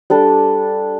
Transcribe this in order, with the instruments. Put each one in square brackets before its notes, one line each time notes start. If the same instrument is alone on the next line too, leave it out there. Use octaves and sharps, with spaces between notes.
[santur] G3 D4 A4